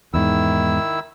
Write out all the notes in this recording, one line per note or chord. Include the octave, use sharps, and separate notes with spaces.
E2 G#2 D#3 E4 E6